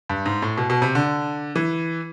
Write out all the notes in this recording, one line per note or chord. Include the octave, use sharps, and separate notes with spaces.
G2
G#2
A2
B2
B2
C3
D3
E3